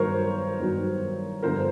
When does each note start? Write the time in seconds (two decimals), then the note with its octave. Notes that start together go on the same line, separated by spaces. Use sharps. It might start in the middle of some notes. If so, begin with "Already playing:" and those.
Already playing: G2 D#3 F#3 A#4 C5 C#5
0.60 G2 D#3 F#3
1.42 G2 D3 F3 A#4 C5